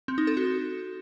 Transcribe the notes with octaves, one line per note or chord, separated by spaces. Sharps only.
C4
D#4
A4
F#4